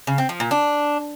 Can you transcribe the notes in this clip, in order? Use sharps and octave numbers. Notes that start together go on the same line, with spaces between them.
C#3
C4
F3
A#2
D4